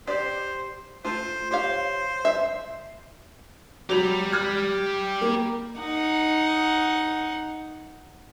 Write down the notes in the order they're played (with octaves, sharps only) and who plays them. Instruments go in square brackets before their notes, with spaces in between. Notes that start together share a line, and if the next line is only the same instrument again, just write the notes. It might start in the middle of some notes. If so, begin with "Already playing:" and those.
[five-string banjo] G4 D5 [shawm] C5
[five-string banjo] A3 F4 [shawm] C5
[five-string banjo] G4 C#5 F5 [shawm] C5
[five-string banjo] E5
[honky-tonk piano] F#3 F7 [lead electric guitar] G4 B5
[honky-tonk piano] F6 G#6
A#3
[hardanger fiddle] D#4 F#5